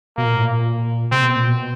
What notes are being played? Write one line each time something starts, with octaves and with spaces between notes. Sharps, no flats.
B2 A#3
A#2
A2
A#2
C3 C4
B2
A#2
B2